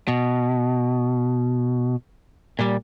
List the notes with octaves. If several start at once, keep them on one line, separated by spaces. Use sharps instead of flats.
B2
A#2 G3